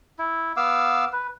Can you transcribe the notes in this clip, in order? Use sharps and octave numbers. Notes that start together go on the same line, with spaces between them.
E4
B3 F5 D6 E6
B4